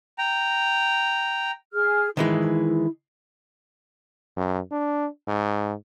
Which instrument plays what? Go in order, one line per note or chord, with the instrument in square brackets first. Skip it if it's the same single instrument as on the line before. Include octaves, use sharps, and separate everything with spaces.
[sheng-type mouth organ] G5 A#5
[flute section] G#4 F6
[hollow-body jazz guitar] D#3 E3 G#3 [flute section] E4
[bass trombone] F#2
D4
G#2